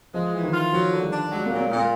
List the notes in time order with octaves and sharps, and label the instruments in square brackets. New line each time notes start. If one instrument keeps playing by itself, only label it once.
[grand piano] F3 [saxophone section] G#3
[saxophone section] E3
[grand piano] D#3
[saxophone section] F4
[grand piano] F3 [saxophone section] F#3
[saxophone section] D3
[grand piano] G3
[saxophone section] D4
[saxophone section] F#3 [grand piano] G#3
[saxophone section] A#2 [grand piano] A#3
[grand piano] A#3
[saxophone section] A#2
[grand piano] A#3